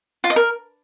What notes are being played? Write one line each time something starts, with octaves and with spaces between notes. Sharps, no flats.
F4
D#5
A#4